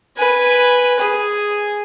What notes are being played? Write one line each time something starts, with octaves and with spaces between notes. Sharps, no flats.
B4 G#5
G#4